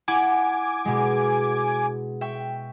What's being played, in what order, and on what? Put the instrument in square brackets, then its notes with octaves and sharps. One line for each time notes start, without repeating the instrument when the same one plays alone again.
[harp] E4 F#5 [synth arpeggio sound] G#5 D6 G#6
[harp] B2 G#3
E5 G5 C#6